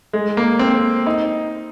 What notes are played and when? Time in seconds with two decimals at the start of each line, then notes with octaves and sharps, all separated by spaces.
0.13 G#3
0.37 A#3
0.59 C4
1.07 D#4